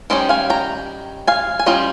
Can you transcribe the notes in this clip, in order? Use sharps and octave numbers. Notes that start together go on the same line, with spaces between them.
D#3 G3 C#4 C5 D#5
F5 G#5
G5 A#5
F5 G#5
G#5
G3 C#4 F4 D#5 G5